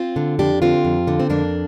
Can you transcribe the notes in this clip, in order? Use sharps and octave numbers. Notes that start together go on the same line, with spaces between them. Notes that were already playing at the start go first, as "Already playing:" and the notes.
Already playing: C4 F4
D3
F2 D4 G4
D3 C4 F4
F2
D3
C4
F2 A#3 D4